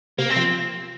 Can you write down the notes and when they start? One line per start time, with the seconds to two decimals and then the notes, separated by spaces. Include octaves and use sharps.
0.18 C3 A#3
0.30 C4
0.36 F3